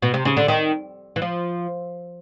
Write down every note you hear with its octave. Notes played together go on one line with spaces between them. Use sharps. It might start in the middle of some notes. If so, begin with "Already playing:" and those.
B2
C3
C#3
D3
D#3
E3
F3